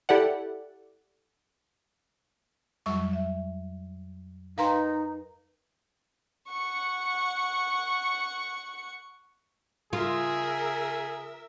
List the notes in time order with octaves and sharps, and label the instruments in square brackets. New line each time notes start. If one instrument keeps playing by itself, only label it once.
[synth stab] E4 G4 A4 D5 F#5
[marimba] F2 F#3 [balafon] G3 C#6
[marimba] E5
[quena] D#4 [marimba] A#4 B4 G5 [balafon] F5 A#5 C6
[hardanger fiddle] F#5 C#6
[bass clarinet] C#3 [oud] F4 [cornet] G#4 [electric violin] A#4 E5